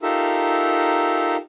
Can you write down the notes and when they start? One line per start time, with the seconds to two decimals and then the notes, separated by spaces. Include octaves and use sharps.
0.03 D#4 F4 G4 A4 A#4 E5